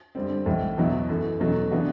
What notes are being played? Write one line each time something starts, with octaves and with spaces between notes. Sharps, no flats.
F#2 D3 G3 C4
B1 A2 E3
E2 B2 F#3 B3 E4
F#2 E3 A3
E2 B2 F#3 A3
C3 E3 B3 D4 F#4